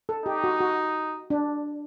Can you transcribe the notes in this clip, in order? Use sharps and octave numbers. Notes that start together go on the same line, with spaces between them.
A4
D#4 G4
F#4
F#4
D4